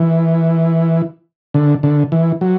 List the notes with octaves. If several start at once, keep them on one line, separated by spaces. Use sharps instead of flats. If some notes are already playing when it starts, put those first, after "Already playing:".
Already playing: E3
D3
D3
E3
F#3